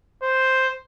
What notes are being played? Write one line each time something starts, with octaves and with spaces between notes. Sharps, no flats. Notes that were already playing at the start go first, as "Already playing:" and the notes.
C5